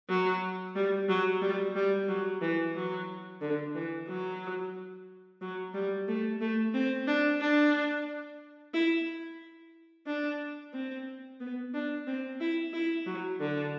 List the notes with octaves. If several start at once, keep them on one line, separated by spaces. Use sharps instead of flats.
F#3
G3
F#3
G3
G3
F#3
E3
F#3
D3
E3
F#3
F#3
G3
A3
A3
C4
D4
D4
E4
D4
C4
B3
D4
C4
E4
E4
F#3
D3